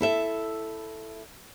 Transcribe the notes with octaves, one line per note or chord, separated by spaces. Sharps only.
E4 A4 E5